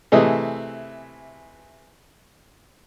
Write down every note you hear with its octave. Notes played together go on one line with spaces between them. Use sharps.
C3 E3 A3 G#4 D#5